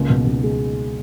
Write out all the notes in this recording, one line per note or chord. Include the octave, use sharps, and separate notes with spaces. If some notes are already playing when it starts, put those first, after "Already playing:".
Already playing: C#2 A#3
B2
C#2
G#3